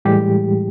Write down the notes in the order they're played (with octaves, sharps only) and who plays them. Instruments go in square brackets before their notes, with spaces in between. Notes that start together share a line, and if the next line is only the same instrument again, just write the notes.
[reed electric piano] A2 E3 G3 G#3 G4